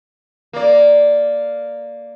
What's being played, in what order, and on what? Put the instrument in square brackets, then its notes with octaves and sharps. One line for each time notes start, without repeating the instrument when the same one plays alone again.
[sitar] A#3 D5